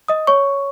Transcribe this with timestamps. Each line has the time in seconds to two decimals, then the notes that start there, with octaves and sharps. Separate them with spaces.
0.08 D#5 D#6
0.27 C#5 C#6